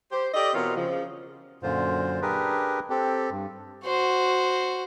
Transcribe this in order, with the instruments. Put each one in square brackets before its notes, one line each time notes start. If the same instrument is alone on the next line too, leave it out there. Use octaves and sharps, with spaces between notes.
[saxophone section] G4 C5
G4 A4 D5 D#5
B2 E3 C4 F4 A#4 C#5
C#3 F3
[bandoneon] F#2 A#2 D3 F4 C5
D4 G4 G#4 A#4 B4
C4 G4 A4
G2
[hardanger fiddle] F#4 C5